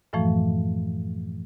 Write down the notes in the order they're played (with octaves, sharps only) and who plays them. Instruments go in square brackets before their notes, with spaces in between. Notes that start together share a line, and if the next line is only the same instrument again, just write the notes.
[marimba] F#2 A2 E3 F3 A3